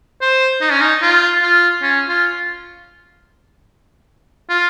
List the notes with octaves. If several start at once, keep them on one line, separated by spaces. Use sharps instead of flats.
C5
D#4
C#4
D#4
F4
F4
C#4
F4
F4